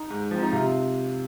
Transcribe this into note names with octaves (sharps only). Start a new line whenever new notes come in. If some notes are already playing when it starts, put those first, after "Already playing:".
Already playing: D#4
G#2
F3 C4
D#4
C3 F4